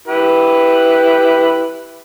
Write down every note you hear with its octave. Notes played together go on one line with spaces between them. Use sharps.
E4 G4 B4